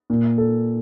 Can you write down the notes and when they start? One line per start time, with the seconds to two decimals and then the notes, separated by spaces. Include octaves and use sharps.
0.10 A#2
0.38 A4